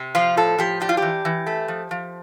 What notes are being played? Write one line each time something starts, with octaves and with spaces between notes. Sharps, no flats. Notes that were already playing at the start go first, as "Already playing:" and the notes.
Already playing: C3
F3 F4
A2 A4
F3 G4
D4 G4
F4
E3 G4
E3
A3
F3
F3